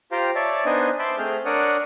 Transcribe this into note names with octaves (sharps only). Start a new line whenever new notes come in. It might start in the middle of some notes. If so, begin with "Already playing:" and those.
F4 G4 C5 F5 G5 A#5
C#5 D5 E5 A5
B3 D4 D#4 C5 D#5 G#5
C5 E5 A5 B5 C6 D6
A3 C4 G#4 F6 G6
D4 A#4 C#5 D5 F#5 D#6